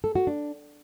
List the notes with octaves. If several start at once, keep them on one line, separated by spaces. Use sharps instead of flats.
A4
F#4
D4